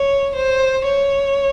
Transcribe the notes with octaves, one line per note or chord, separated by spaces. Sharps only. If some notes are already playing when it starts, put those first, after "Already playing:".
Already playing: C#5
C5
C#5